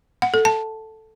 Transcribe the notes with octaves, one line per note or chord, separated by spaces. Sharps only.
F#5
A4
A5